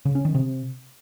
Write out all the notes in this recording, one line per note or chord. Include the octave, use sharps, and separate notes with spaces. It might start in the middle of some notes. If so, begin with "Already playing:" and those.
C#3
C#4
D#3
C3